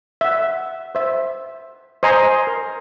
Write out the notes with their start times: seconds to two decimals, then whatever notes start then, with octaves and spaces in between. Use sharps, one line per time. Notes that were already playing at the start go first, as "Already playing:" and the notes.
0.21 E5 F#5
0.95 C5 E5
2.03 C5 D#5 G#5 A#5 C6
2.47 A#4